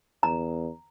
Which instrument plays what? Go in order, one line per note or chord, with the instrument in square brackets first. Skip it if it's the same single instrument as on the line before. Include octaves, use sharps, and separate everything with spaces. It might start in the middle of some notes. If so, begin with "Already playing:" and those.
[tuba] E2 [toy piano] A#5